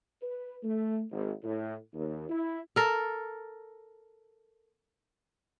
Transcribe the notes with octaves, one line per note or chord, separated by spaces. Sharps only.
B4
A3
G#1
A2
D#2
E4
A4 A#4